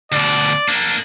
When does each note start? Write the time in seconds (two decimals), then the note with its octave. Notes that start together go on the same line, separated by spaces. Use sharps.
0.12 D2 B2 D5
0.68 A#3 D4